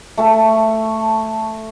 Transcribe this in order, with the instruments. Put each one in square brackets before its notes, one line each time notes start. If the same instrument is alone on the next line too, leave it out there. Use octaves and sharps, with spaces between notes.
[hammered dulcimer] A3 A5